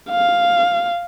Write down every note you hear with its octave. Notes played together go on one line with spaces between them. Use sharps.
F5